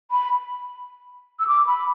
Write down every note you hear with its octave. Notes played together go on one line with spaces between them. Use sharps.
B5
E6
D6
B5